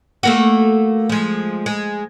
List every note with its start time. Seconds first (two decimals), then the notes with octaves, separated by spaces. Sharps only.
0.23 A3 A#3 F#4
1.09 F3 G#3
1.66 G#3